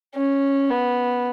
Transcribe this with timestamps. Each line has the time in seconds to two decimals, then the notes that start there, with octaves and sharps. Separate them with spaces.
0.15 C#4
0.69 B3